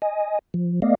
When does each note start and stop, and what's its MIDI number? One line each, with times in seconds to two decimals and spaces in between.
0.02 0.39 75
0.02 0.39 80
0.54 0.80 53
0.82 0.95 57
0.82 0.95 59
0.82 0.95 74
0.82 0.95 75
0.82 0.95 77